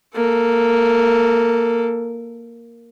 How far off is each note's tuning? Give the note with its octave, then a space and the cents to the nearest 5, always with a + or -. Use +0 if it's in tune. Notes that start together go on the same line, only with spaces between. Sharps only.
A#3 +0 A4 +10